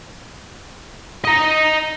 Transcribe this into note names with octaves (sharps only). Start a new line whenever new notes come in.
D#5 A#5